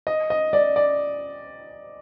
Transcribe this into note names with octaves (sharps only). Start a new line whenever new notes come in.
D#5
D#5
D5
D5